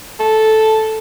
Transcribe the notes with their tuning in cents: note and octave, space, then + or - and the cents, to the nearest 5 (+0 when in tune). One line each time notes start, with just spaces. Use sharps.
A4 -5